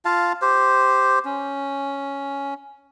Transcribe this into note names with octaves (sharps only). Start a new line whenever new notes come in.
F4 F5 A5
G4 C5
C#4